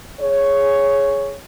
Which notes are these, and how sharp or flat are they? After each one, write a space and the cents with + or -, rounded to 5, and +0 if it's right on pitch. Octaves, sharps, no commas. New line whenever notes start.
G#4 +0 C#5 +0